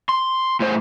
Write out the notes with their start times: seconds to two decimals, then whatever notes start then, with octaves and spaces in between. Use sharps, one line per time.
0.09 C6
0.60 A2 C5